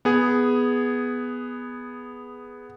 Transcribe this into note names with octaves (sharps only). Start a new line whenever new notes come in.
B3 G#4